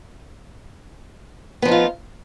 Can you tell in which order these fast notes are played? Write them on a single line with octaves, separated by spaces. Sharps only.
B3 F3 D#4 F4